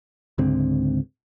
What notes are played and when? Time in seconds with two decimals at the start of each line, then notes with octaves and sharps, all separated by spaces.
0.38 C#2 G#2 D3 C4